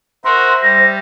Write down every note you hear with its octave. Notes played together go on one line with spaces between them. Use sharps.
F#4 A#4 C5 E5 C6
G3 A#6